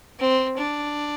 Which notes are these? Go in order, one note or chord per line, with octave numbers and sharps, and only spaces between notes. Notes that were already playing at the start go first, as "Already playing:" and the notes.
C4
D4